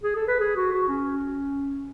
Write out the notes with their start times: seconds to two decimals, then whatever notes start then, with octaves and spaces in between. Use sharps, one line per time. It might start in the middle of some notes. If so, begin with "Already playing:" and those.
0.04 G#4
0.16 A4
0.28 B4
0.40 G#4
0.57 F#4
0.73 F#4
0.89 C#4